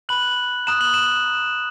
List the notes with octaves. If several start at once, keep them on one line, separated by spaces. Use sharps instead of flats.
B5 F#6 F#7
A#5 D#6 F#6 E7
F#7
E7